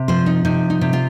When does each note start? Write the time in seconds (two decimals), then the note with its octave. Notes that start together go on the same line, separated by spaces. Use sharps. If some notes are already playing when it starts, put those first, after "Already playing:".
Already playing: C3
0.08 F3 C5
0.26 D#4
0.45 C3 D#4
0.70 D#4
0.81 C3
0.93 F4